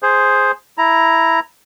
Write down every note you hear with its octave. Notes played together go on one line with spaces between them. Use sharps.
G#4 C5
E4 A#5